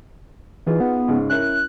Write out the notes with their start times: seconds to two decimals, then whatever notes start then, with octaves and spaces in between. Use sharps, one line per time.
0.66 E3 D#4 F4 G#4
0.80 B3
1.08 G#2 C#3
1.30 C#4 E4 A#4 F#6